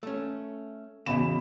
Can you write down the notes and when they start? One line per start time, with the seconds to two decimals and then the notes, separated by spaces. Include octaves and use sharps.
0.03 A3 C#4
1.06 B1 E2 C#3 B5 E7